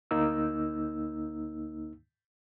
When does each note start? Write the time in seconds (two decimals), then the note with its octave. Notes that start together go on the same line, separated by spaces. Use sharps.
0.11 D2 A#3 D#4 E6